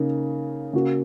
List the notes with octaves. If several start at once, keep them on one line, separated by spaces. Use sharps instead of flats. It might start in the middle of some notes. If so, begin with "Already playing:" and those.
Already playing: C#3 A#3 D#4
C#3 A#3 F#4